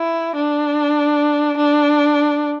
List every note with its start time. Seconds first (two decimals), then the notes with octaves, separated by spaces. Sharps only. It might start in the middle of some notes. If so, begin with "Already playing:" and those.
Already playing: E4
0.35 D4
1.57 D4